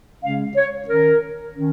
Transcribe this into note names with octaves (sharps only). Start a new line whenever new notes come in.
C#3 G#3 C#4 F5
C#5
D#3 C#4 A#4
D#3 C#4